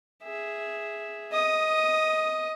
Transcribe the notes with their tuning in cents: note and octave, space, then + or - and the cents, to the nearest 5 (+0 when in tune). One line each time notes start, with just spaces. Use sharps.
G#4 +0 E5 +0
D#5 +15 D#6 +0